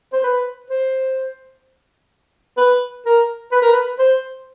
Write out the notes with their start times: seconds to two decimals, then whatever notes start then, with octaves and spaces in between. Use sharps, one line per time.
0.13 C5
0.24 B4
0.70 C5
2.57 B4
3.06 A#4
3.52 B4
3.62 A#4
3.72 B4
3.99 C5